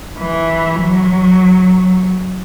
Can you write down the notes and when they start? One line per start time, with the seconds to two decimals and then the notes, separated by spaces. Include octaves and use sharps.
0.19 E3
0.81 F#3